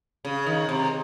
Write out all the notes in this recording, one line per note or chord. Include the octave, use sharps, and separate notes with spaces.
C#3
D#3
C3